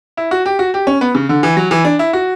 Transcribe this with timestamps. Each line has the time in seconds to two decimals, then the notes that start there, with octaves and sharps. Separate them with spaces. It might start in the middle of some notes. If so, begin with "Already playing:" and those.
0.17 E4
0.31 F#4
0.46 G4
0.59 F#4
0.74 G4
0.87 C#4
1.01 B3
1.15 C#3
1.29 D3
1.43 E3
1.57 F#3
1.71 E3
1.85 D4
1.99 E4
2.13 F#4